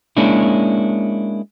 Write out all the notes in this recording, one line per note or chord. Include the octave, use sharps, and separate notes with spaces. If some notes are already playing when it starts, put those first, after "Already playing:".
G#3 A#3 C#4 D4 E4